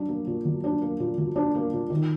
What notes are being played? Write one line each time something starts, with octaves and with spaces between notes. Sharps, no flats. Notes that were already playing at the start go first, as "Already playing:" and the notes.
Already playing: F#3 D4
A#3
A#2
F#3
D4
A#3
A#2
F#3
D4
A#3
A#2
D#3